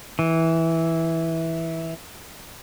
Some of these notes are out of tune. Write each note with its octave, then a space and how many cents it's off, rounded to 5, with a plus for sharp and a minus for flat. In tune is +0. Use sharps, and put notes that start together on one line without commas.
E3 -10